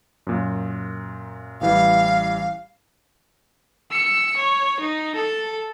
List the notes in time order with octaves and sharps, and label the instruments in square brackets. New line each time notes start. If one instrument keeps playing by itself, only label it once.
[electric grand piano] F#2 A#2
[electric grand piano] A1 E3 G3 [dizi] F5
[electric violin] E6 C#7
C#5
D#4
A4